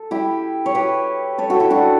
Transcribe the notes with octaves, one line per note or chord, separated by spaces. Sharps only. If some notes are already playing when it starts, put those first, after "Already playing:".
Already playing: A4
E4 G4
C#5
G4 B4
A4 C#5
F#4 A4
E4 G4
D4 F#4